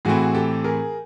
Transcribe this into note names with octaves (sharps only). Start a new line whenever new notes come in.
A2 E3 A3 C4 F#4 G#4
G4 A4
G#4 A#4